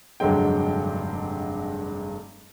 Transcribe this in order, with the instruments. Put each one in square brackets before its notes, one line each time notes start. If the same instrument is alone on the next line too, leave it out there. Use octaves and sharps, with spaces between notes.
[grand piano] F1 G2 D3 F#3 G#3 G5